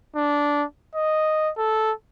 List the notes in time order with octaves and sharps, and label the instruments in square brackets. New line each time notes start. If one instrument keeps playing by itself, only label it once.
[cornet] D4
D#5
A4